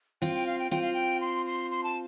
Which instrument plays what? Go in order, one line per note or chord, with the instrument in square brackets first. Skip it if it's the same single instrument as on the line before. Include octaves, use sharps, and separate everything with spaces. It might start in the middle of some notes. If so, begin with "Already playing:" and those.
[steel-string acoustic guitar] C4 F4 [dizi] G5
[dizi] G5
F5
G5
[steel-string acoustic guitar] C4 F4 [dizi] G5
[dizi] F5
G5
C6
C6
C6
A5